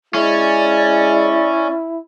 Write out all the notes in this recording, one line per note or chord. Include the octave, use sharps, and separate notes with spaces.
G#3 C#4 E4 D5